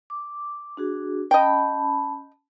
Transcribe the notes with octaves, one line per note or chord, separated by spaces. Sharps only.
D6
D4 F#4 G#4
C#4 D#5 G5 A5 B5